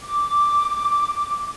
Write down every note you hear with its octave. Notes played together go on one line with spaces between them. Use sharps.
D6